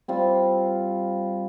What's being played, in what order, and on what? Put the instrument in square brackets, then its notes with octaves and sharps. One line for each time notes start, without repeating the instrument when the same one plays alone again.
[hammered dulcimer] G3 C4 F4